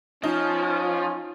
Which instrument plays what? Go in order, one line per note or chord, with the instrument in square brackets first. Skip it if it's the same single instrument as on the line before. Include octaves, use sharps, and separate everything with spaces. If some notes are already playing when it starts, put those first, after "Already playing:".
[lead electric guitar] F3 [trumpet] C#4 [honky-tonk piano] D#4